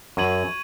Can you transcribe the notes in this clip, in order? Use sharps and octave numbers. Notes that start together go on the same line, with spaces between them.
F#2 C#6 G#6 D#7 F#7